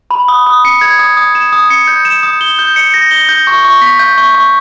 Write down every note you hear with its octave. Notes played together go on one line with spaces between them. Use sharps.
B5
D#6
D#6
C#7
G#6
D#6
D#6
E7
D#6
C#7
G6
E7
D#6
G7
G6
C#7
A#6
G7
G6
C#6
C#6
B6
G6
C#6
C#6